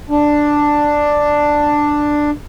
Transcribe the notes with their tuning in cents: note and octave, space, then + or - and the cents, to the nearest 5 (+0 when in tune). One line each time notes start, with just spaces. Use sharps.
D4 +5